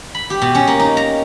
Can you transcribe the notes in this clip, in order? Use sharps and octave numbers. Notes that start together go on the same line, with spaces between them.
B5
G4
B2
C#4
A#3
D#4
A#5